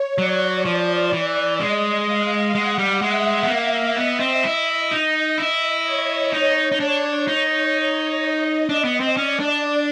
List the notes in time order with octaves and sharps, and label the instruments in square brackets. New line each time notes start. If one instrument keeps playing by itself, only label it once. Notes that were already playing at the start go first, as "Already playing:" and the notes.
Already playing: [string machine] C#5
[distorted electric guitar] F#3 [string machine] D5
[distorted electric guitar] F3
[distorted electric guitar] E3 [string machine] D5
[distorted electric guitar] G#3 [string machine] D#5
[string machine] F5
[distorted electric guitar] G#3 [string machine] F#5
[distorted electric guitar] G3
[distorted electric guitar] G#3 [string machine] E5
[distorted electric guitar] B3
A#3
[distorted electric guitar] B3 [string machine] D#5
[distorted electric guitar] C4
E4
D#4
E4
[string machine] C#5
[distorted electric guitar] D#4
D#4
[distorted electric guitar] D4 [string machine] C#5
[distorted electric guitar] D#4
[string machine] D#5
[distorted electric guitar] D4
B3
C4
[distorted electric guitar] C#4 [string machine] D5
[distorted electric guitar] D4